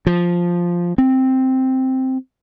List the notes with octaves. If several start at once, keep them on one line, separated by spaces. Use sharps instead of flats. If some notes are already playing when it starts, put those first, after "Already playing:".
F3
C4